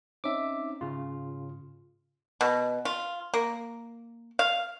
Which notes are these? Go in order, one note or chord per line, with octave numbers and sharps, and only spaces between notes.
C4 C#4 D#4 E5 D6
G#2 C#3 F4
B2
F4
A#3
F5